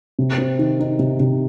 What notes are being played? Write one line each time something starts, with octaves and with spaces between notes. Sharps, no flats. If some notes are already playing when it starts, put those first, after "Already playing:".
C3
C4
D#3
D#4
C3
C3